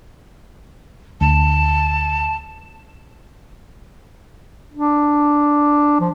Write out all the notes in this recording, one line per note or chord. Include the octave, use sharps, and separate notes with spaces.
D2 A5
D4
F3